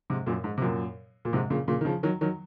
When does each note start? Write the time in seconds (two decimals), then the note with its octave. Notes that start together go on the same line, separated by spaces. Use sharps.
0.10 G#2 C3
0.26 F#2 A#2
0.44 G#2
0.58 C3
0.61 F#2 A#2
1.25 A#2
1.33 G#2 C3
1.50 A#2 C#3
1.68 A#2 C#3
1.81 D#3
1.85 C#3 F3
2.03 D#3 F#3
2.21 D#3 F#3